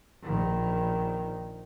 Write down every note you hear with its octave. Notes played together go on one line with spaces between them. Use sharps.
A#1 D#3